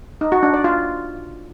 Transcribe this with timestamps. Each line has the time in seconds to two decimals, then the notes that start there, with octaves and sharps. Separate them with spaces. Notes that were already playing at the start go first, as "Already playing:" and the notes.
0.21 D#4
0.32 F#4
0.43 D4
0.54 D5
0.64 F4